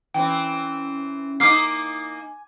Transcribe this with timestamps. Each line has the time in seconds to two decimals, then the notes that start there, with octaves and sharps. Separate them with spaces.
0.14 E3 C4 C#4 G5
1.40 A#3 D#4 G#5 D6 F6 C7